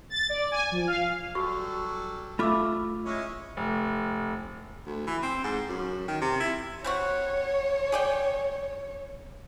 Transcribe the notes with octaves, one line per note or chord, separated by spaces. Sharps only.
A6
D5
G#5
F3
F5
F#3 G3 F#4 A4 C#6
A3 F4 E5 B5 D6 E6
G#3 C#4 E4
F1
D2
E3
C4
G#2
F#2
D#3
C3
E4
G3 C4 F#4 C#5
G#4 D5 G5